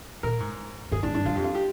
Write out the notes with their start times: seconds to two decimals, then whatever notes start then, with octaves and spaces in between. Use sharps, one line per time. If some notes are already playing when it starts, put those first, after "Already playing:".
0.23 A#2 A#4
0.40 G#2
0.92 G#2 G#4
1.03 G#2 D4
1.14 G2 D4
1.25 G2 F4
1.35 F2 G4
1.44 F4
1.55 G4